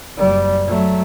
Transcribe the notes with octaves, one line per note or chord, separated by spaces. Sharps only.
F#1 G3
F#3 A3